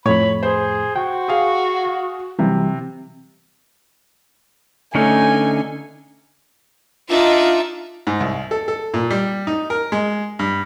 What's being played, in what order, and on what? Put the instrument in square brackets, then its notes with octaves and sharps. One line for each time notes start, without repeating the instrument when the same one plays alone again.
[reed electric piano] F2 A2 [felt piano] C#5 [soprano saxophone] B5
[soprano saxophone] G#4 [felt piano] C5
[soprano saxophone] F#4 [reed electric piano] G5
[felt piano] G#4 F5
[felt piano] C3 [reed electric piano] E3 F#3 G3
[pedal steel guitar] D3 C#4 D#4 [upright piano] A3 [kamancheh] G#5
[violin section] D4 D#4 E5 [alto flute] F4
[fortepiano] G#2
C2
A4
A4
A#2
G3
D#4
A#4
G#3
G2